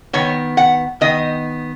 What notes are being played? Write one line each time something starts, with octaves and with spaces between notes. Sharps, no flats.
D#3 B3 C#5
F#5
D#3 B3 D#5